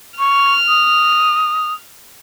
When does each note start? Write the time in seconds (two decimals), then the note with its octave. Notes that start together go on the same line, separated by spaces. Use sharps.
0.19 C#6 F6
0.68 D#6